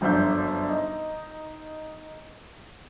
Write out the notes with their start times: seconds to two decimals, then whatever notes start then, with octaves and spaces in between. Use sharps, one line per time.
0.01 G1 F#2 F3 D4 E5 G6
0.69 D#4